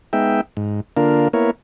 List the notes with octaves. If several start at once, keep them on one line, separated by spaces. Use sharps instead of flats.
G#3 B3 D#4 E5 G5
G#2
D3 A#3 D4 F4 A#4
A#3 B3 E4 A#4 C#5